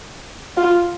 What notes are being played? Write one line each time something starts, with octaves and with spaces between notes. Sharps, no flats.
F4